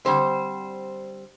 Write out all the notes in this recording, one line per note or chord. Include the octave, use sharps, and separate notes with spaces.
D3 G3 C4 C5